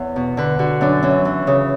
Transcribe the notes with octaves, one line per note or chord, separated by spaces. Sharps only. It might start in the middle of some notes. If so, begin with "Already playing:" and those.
Already playing: E2 C#5
B2
D3 B4
D3 F#4
F#2 D4
E3 C#4
E3
C#3